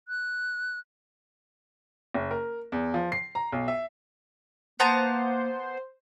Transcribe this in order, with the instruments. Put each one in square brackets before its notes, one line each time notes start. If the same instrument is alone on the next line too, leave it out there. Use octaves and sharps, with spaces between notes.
[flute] F#6
[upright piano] F#1
A#4
E2
F3
C7
A#5
B1
E5
[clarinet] A#3 [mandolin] B3 A5 A#5 [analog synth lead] C5